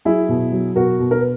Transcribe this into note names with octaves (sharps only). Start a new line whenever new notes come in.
F#3 E4 G#4
B2
F#3
B2 F#4 A#4
B2
A#4
B4